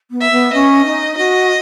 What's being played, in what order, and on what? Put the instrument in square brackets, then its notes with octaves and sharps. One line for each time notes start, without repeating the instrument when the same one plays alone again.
[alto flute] B3
[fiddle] E5
[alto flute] B3
[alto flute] C#4 [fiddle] D#5
[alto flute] D#4
[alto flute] F#4 [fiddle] D#5